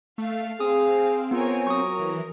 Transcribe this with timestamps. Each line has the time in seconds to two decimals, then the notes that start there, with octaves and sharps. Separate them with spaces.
0.18 A3 F5
0.60 C4 G#4 D#6
1.31 B3 F4 A#4 C#5 G#5
1.67 F#3 A#4 C#6 D#6
1.99 E3